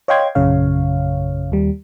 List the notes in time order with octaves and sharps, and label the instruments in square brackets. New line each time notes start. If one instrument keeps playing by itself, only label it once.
[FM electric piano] C#5 D#5 F5 G5 C6 G#6
A#1 F#2 C#3 C#5 F5
D#2 G3